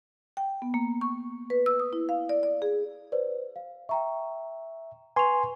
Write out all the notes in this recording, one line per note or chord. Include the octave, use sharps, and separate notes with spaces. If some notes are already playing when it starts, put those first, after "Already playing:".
G5
B3
A#3
C#6
B4
E6
D#6
E4
F5
D5
D5
G#4
B4 C5 D5
F5
E5 G5 A#5 C#6
B4 G#5 C6 C#6 F7